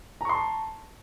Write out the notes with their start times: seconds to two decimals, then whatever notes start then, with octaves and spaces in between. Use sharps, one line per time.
0.21 A#5
0.25 C#6
0.29 C6
0.34 A5